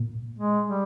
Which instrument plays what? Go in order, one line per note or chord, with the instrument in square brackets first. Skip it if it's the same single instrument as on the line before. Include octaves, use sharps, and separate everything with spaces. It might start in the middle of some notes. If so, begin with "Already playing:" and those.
Already playing: [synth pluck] A#2
[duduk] G#3
G3